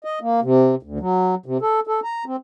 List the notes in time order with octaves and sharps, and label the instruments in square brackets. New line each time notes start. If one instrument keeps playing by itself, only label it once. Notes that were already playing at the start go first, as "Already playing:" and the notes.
[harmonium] D#5
A#3
C3
D2
F#3
C3
A4
A4
A#5
C4